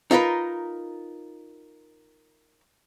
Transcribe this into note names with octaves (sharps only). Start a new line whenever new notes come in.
D#4 F4 A#4 B4